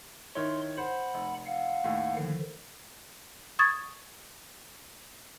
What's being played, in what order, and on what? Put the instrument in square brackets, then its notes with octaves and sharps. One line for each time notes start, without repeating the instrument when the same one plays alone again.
[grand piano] D#3 E4 C#5 [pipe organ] C6
[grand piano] C5 [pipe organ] F#5 B5
[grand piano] F1
[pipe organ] F5 F#5
[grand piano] D#2 A2
[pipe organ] D3 D#3 F3
[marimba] C#6 D#6 G#6 A6